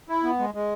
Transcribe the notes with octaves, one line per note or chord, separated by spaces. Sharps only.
E4
B3
G#3
G#3